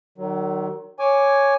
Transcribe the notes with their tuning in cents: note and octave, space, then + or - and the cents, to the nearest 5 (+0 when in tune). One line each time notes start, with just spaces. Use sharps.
D#3 -25 F#3 +25
C#5 +0 G#5 +0 D6 +0